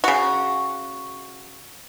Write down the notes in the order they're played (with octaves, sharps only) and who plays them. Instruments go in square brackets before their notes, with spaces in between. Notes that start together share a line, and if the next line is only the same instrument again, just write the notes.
[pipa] C#3 F#4